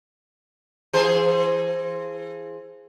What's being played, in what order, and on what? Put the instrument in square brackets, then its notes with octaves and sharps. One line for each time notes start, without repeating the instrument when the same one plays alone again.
[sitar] E3 G#4 C5